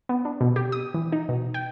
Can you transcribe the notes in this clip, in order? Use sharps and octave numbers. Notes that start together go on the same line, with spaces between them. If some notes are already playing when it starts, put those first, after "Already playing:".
B3
D4
B2
G4
D#6
E3
D#4
B2
G5